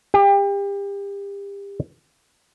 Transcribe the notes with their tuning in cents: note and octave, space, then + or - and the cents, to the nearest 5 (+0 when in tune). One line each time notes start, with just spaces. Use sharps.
G4 +30